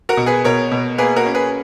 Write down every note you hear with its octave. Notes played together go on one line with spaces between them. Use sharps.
F#4 A#4
B2
G#4 B4
B2 A#4 C#5
B2
A#3 G#4 B4
F#4 A#4
C#4
G#4 B4